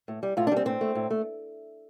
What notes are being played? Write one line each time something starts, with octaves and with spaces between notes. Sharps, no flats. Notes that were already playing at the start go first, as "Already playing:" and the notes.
A2
G3
A2 F4
D4
G3 C4
A2 C4
A3
A2
A3